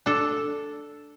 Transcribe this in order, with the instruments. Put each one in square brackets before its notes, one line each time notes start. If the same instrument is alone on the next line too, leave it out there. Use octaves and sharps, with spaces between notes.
[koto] D4 A4